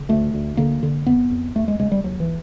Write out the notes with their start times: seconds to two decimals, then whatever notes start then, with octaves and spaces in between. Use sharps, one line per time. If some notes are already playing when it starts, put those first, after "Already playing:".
Already playing: C#3
0.09 D2 A3
0.34 D2
0.57 D3 A#3
0.83 D3
1.07 F2 B3
1.31 F2
1.55 D#2 A3
1.68 G#3
1.80 C#3 G#3
1.92 G3
2.04 D#2 F#3
2.20 E3